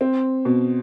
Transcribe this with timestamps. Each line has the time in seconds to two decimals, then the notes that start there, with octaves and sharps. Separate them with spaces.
0.01 C4
0.45 B2